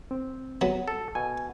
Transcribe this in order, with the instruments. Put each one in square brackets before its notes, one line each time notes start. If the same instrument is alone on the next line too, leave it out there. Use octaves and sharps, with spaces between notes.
[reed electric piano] C4
[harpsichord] F#3 B3
[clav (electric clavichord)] A4
[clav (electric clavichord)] B2 [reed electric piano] G#5